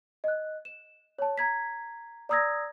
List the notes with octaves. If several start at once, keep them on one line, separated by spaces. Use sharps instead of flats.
D#5 F#6
E7
C#5 A5
A#5 G#6 B6
D5 A#5 D#6 E6 G#6 A#6